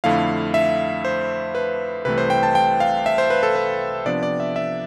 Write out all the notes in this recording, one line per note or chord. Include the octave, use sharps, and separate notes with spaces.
F2 D3 A3 E4 F5
E5
C5
B4
C2 C3 E3 A3 B4
C5
G5
A5
G5
F5
E5
C5
B4
A4
B4
C3 F3 B3 D4 D5
D5
E5
E5